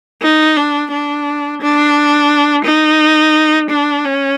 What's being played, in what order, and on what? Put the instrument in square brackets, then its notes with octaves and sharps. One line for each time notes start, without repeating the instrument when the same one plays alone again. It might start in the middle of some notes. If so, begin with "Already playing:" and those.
[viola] D#4
D4
D4
D4
D#4
D4
C#4